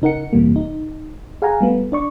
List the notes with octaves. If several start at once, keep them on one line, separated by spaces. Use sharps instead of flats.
C#3 D#4 A#4 F#5 C#7
G1 F2 C3 E3 G3 A#3
D#4
G#4 F5 F#5 G#5 A#5
G3 A3 B3
D4 D5 C#6